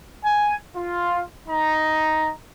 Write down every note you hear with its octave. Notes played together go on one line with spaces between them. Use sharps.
G#5
F4
D#4 A#5